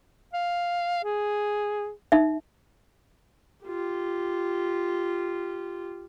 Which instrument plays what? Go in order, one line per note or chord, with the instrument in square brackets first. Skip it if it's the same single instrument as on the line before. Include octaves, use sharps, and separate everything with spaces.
[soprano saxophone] F5
G#4
[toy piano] D#4 E5
[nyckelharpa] F4 G4